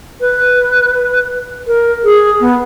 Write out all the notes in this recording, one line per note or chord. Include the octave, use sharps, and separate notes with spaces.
B4
A#4
G#4
B3